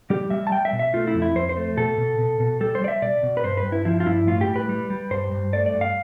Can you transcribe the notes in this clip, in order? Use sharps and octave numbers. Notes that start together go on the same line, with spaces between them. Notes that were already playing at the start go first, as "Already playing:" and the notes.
G3 G4
G3 E5
A5
G3 G5
E5
B2
E5
A3 F4
E4
F2
E4
F2 C5
C5
A3
B2 A4
B2
B2
B2
G3 A4
C5
G3 D5
E5
B2 D5
B2
B4
G2 C5
B4
G2
E4
F3 E4
F4
G2 E4
A2 F4
G4
G3
B4
G3
G3
G2 C5
G2
A3 D5
D5
G2
F5